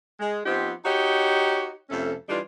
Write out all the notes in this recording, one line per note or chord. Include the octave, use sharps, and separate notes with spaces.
G#3
F3 B3 C4 D#4 G4
D#4 F#4 G4 C#5 D#5
F2 C3 A3 C#4 A4
E3 G3 D4 D#4 F4